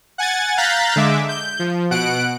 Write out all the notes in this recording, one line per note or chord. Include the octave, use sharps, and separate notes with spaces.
F#5 G#5 G#6 A6
F5 A#5 F#6 G6 A6 B6
D3 G#3 E5 D6
G6
F3
B2 F#5 F#6 D7